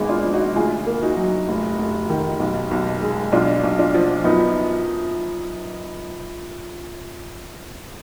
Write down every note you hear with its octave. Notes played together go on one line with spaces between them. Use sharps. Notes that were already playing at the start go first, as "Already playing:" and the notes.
Already playing: G#1 G#3 B3 D#4
D4 F4
F3
D#4 F#4
D2 F4 G#4
A#3
D#4 F#4
F#3
F1
F1
D#3
B1
B1
G#3
B1 D4 F4
B1
D4 F4
F3
F#2 B3 D#4